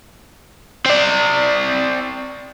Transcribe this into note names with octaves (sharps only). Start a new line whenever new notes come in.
C4 D5